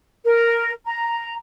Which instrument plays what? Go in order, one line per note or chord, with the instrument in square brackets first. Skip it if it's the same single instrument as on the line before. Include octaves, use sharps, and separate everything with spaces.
[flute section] A#4
A#5